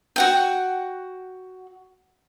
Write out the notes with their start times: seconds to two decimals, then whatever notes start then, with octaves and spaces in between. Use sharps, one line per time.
0.16 F#4 F#5 G5